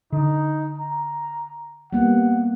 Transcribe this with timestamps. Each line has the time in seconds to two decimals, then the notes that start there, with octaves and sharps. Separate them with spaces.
0.12 D3 D#4
0.78 A#5
1.93 G3 A#3 B3 F#5